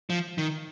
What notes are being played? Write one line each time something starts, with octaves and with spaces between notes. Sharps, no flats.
F3
D#3